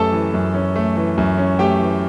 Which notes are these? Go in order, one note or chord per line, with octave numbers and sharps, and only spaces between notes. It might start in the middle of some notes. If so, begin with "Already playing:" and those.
Already playing: F#2 A3 C#4 G4 A4 A5
E3
F#2
C#4
A3
E3
F#2
C#4
A3 G4 G5
E3